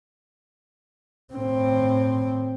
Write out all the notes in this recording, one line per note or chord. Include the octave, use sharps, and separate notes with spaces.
A2 C4